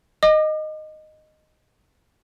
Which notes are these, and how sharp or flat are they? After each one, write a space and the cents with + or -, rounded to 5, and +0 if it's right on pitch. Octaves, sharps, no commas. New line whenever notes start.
D#5 -10 D6 +40